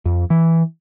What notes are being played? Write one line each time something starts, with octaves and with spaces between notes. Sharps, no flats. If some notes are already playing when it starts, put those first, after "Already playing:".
F2
E3